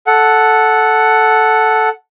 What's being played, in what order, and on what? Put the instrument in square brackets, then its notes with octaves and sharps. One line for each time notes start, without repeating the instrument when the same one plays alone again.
[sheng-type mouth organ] A4 F#5